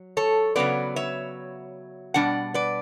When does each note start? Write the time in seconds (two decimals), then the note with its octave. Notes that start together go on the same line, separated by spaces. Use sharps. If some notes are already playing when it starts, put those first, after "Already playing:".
Already playing: F#3
0.17 A4 C#5
0.56 C#3 F#3 B3 B4 D5
0.96 C#5 E5
2.14 B2 G3 D4 D5 F#5
2.54 B4 D5